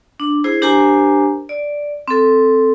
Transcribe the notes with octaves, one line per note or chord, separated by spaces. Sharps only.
D4
E4 G#4 C5
D4 G4 A#4 C5 G#5 A#5
D5
C4 A4